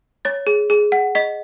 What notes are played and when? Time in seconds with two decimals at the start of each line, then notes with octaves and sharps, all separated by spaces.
0.25 C#5 A6
0.47 G#4
0.70 G#4
0.92 F#5
1.15 D#5 B6